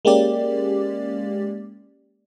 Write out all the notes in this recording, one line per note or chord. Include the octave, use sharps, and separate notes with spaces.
G#3 A#3 C#4 G4 D5